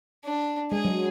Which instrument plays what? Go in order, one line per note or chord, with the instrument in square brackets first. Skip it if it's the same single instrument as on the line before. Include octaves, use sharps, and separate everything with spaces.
[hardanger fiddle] D4
[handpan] G#3 [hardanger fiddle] G#4
[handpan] F#3